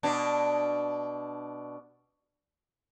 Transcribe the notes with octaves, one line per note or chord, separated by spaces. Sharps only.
B2 D4